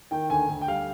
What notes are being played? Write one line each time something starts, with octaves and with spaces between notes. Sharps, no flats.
D#3 G5
D2 G#5
D2
G5
G3 F5